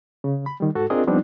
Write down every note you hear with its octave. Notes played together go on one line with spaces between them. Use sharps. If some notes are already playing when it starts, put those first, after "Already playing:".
C#3
B5
D#3 G3
G#2 F#4 A4
C4 D4 F4 G#4 A#4 D#5
F3 G3 B3 C4 D4 D#4